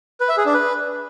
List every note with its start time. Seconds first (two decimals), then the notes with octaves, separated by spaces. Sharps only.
0.21 B4
0.29 E5
0.37 G#4
0.46 D4
0.54 B4